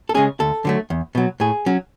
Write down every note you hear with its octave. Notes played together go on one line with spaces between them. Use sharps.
A4
C#3 G#3 C#4 G#4
D2 A4
D3 F#3 A3
E2
B2 F#3
A2 G#4
F#3 C#4